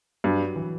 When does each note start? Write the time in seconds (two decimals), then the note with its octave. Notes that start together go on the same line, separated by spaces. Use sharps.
0.24 G2 F#3
0.56 E3